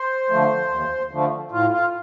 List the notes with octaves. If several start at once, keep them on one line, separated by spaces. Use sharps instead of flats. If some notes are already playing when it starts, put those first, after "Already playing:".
Already playing: C5
D3 F3 A3
D#2
D3 F3 A3
A2 F4
F4